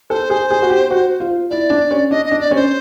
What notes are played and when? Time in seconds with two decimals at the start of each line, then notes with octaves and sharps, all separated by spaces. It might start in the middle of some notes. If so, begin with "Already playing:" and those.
0.10 A4 C5
0.30 G#4
0.50 G#4
0.62 F#4
0.70 G4
0.91 F#4
1.20 F4
1.50 E4 D5
1.70 D4
1.91 C#4
2.11 D4 D#5
2.26 D#5
2.31 D4
2.40 D5
2.51 C#4 C5